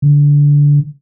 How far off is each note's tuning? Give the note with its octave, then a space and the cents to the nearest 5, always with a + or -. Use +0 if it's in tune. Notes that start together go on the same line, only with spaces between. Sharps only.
D3 -20